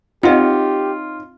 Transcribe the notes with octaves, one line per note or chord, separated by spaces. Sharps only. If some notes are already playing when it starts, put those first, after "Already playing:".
C4 D#4 F4 G4 C#5 D#5 F#5